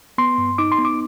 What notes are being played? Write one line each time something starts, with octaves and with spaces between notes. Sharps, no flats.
B3 C6
G2
D#4 D6
C6
B3
D6